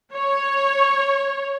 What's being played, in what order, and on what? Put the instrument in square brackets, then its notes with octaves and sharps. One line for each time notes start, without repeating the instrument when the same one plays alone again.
[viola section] C#5